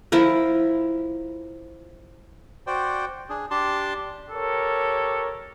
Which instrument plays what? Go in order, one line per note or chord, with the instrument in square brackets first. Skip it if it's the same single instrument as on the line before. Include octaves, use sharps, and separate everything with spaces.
[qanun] F3 E4 F4 A#4
[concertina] F#4 C5 D5 G5
D4 G#4
D4 G4 A5 C6
[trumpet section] G4 A4 A#4 C#5